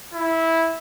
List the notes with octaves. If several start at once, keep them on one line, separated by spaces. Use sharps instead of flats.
E4